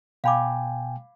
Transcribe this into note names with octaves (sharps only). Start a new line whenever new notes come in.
B2 F5 G5 G#5 B5 D6